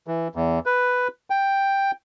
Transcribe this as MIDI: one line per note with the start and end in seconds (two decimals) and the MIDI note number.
0.07 0.28 52
0.35 0.59 40
0.66 1.08 71
1.30 1.91 79